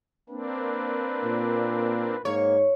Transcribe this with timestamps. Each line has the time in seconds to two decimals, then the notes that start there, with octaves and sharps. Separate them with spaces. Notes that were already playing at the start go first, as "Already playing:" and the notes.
0.29 A#3 C4 D4 B4
1.24 A#2
2.25 G#2 A#3 C#5